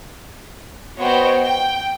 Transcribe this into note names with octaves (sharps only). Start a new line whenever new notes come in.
B3 F#4 C5 C#5 D#5 G5
G5